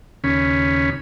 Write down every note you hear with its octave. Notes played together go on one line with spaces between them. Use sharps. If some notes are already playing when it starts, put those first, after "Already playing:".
D#2 C#3 C#4 B5